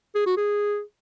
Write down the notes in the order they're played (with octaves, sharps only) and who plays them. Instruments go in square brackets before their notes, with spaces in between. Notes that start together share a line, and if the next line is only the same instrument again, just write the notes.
[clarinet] G#4
F#4
G#4